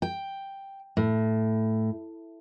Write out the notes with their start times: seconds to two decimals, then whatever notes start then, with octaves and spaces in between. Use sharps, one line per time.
0.02 G5
0.97 A2